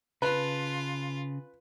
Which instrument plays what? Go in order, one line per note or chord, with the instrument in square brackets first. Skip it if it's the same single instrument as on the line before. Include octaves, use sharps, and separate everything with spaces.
[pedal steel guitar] C#3 A5 [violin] F4 [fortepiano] B4